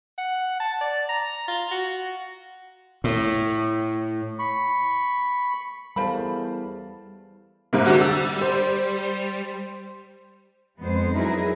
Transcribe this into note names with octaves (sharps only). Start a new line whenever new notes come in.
F#5
A5
D5
A#5
F4
F#4
A2
B5 C#6
E2 G3 A4 A#4 C5 F5 A5 B5
G#2 C3 A#3
D3 G3 F#4
E6
C5
F2 G#3 B3 C5
F#3 D#4 E4 G#4 A#4 B4